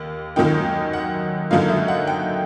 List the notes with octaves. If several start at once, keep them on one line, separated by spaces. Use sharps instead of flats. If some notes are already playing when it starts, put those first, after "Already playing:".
Already playing: D#2 A#3
F#2 D#3 F#3 A#3 D#4 G5
F#5
F#2 D3 F#3 A#3 D#4 F5
E5
F#5
G5